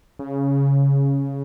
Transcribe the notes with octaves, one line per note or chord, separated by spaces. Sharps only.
C#3